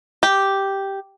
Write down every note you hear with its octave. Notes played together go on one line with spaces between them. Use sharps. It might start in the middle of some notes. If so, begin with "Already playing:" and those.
G4